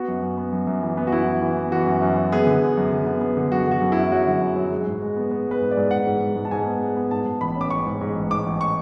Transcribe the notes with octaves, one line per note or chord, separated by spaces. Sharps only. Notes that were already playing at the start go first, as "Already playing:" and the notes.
Already playing: B3 F#4
F#2
F#2
B3
F#2
F#2
E3
B3
F#4
F#2 E4
E3
E3
B3
E3 F#4
F#2
F#2
F#2
B3 G#4
D3
F#2
F#2
D3
B3
B3
D3
F#2 F#4
D3
F#4
F#2
F#2 E4
F#3 F#4
D3
F#2
F#3
G#3
G#2
G#3
B3
B3
G#3 B4
G#2
D5
G#2
G#2 F#5
G#2
G#2
G#2
A5
G#2 G#5
B3
G#3
B3
G#2 A5
G#2
A1 B5
C#4 D6
A1 C#6
G#2
G#2
A1
G#2 D6
A1
C#6